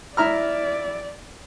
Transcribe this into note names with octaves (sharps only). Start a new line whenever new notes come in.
E4 D5 A#5 F6